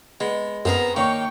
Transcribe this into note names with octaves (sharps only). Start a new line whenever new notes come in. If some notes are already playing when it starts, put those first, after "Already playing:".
G#3 B3
F#2 B3 C4 G#4 A#4 A#5
D#3 A#3 C#5 G5 C#6